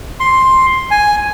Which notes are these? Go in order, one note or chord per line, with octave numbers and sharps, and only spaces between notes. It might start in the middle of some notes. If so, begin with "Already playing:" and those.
C6
G#5